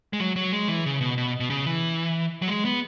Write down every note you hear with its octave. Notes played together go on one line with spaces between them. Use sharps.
G#3
F#3
F#3
G#3
E3
C#3
B2
B2
B2
C#3
E3
F#3
G#3
B3